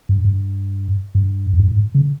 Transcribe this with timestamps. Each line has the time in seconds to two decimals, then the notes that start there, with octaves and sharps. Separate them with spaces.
0.09 G2
0.25 G2
1.15 G2
1.53 F2
1.60 G2
1.71 G#2
1.95 C#3